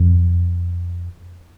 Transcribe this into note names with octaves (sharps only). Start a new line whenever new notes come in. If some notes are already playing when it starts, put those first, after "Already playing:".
Already playing: F2